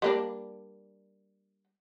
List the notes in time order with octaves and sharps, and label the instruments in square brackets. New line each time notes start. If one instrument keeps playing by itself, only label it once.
[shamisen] G3 A#3 D4